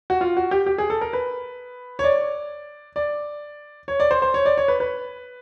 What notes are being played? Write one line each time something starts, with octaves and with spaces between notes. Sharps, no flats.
F#4
F4
F#4
G4
G4
G#4
A4
A#4
B4
C#5
D5
D5
C#5
D5
C5
C5
C#5
D5
C#5
B4
B4